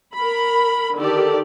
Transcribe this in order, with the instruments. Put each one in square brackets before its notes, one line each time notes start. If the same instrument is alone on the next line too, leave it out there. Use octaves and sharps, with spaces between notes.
[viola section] A#4 B5
D3 D#3 G4 A4 D5